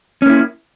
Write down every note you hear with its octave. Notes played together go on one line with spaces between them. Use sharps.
A#3 C#4 E4